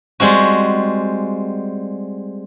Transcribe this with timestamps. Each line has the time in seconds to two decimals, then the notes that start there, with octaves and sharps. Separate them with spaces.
0.20 G3 G#3 C4 F#4